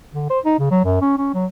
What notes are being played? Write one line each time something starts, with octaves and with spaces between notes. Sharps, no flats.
D3
C5
D#4
C#3
F#3
F#2
C#4
C#4
F#3